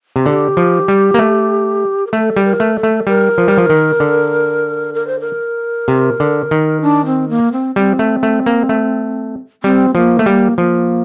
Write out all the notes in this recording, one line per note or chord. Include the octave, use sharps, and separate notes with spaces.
C3
D3 G4
F3
G3
A#3
A3
A#4
A3 A4
G3
A#4
A3
A4
A3
G3 A#4
F3
G3
F3
D#3
D3
A#4
C5
A#4
C3
D3
D#3
D4
C4
A#3
C4
G3 C4
A3
A3
A#3
A3
G3 C4
F3 A#3
A3
G3 A#3
F3 A#3